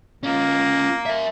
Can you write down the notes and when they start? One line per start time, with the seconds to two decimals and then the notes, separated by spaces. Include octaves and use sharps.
0.23 A#3 C#4 F4
1.06 A#4 E5